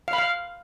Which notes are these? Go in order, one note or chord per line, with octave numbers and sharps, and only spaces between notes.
F5
B5
F5